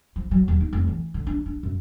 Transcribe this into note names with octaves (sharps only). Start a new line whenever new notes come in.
F3
F#3
D#2
D#4
F1
E3
D3
D4
D4
F#2